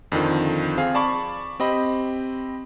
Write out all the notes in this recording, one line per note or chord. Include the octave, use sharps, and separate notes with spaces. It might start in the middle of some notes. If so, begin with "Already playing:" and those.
F2 D3 D#3 F3
C4 G#4 F5
D5 A5 B5 C#6 D6
C4 G4 D#5 B5